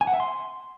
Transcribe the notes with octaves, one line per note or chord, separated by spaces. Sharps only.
G#5
F#5
E5
C6